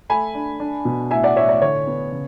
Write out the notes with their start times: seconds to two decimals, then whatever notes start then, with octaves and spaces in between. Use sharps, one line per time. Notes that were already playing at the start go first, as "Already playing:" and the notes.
0.10 A3 G#5 B5
0.35 D4
0.60 D4
0.85 B2
1.11 A2 E5 G#5
1.23 D5 F#5
1.36 A2 C#5 E5
1.49 D5
1.62 D3 C#5
1.87 B3
2.12 C#3